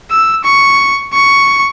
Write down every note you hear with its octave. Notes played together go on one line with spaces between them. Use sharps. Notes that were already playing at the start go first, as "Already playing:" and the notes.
E6
C#6
C#6